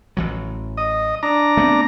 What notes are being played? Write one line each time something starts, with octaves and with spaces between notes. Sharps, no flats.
A1 E3 F#3
D#5
D4 A#5
A3 B3 C4